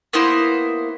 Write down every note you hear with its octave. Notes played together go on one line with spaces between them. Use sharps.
A#3 B3 E4 C5